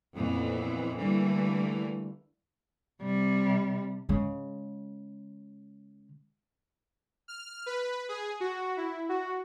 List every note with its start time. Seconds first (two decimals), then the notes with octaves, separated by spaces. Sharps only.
0.15 F2 A#2 E3 B3
0.97 D3 E3 G3 A3 A#3
3.02 C3 G3
4.09 C#3 G#3
7.28 F6
7.66 B4
8.09 G#4
8.40 F#4
8.77 E4
9.09 F#4